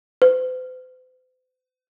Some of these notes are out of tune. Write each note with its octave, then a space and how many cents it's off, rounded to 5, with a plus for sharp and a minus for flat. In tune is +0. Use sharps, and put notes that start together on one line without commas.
C5 -45